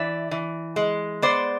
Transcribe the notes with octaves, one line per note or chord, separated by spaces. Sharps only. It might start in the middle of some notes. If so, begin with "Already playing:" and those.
Already playing: E3 D5 E5
E3
G#3
B3 C5 D5